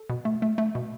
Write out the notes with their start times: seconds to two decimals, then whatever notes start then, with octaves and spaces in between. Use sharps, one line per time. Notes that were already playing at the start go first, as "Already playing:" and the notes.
Already playing: A4
0.10 B2
0.25 A3
0.42 A3
0.58 A3
0.75 B2